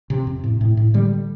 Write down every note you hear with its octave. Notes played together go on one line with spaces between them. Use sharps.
C3
F2
A2
A2
A2
D3 G3